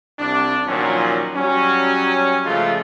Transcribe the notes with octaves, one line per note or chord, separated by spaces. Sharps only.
C2 C3 D4
A#2 D#3 F3 F#3 C#4
F#3 G3 C#4
C#3 F3 G#3 A3 F4